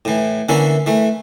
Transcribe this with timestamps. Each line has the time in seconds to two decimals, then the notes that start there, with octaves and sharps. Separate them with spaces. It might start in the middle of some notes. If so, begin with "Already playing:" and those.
0.05 A2 E3
0.49 D3 E3 A#3 C#4 A4 E5
0.86 E3 A3